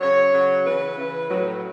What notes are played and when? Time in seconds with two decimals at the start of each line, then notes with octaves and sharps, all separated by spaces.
0.01 C#3 F#3 C#5
0.33 C#3 F#3
0.64 C#3 E3 B4
0.97 C#3 E3
1.29 A2 F#3